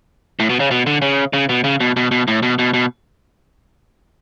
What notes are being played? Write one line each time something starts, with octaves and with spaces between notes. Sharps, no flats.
A2
B2
C#3
B2
D3
C#3
C#3
B2
C#3
B2
B2
B2
A2
B2
B2
B2